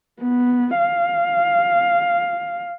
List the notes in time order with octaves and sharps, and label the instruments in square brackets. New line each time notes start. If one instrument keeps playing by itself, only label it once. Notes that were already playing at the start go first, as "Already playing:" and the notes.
[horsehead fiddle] B3
F5